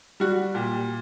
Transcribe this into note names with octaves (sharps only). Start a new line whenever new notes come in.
G3 F#4
A#2 G4